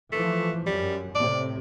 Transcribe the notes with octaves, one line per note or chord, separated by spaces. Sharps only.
E3 F3 A3
F#2 G3
A2 C3 D5